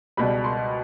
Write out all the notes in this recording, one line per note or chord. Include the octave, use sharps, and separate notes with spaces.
C#2 B2 G3 B5
C6